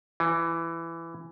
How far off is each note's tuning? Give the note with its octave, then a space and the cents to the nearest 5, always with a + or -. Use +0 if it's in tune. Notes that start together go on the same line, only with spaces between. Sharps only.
E3 +15